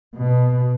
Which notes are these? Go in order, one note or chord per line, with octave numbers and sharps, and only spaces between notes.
B2